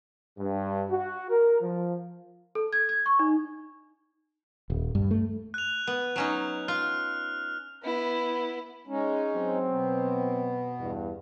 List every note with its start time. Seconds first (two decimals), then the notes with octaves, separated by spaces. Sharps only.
0.38 G2
0.89 F#4
1.29 A#4
1.61 F3
2.55 A4
2.73 G#6
2.89 G#6
3.06 C#6
3.19 D#4
4.70 D#1
4.95 G2
5.11 A3
5.54 F#6 F7
5.87 B3
6.16 F#3 C#4 D#4
6.68 F4 F6
7.83 B3 E4
8.87 G#3 C#4 D#4
9.34 F#3 C4
9.70 B2 B3
10.80 E2 G2